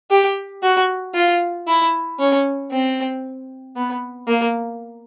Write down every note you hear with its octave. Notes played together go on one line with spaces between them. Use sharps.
G4
F#4
F4
E4
C#4
C4
B3
A#3